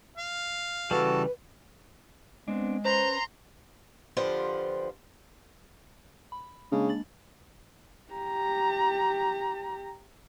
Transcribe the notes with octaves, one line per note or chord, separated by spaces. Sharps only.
F5
C#3 E3 G3 F#4 A4 B4 A5
G#3 B3 C4 D4
C#4 B4 C5 A#5 C6
D3 F3 F4 G4 B4 C5
B5
C#3 G#3 A#3 D4
A6 F#7
G4 A#5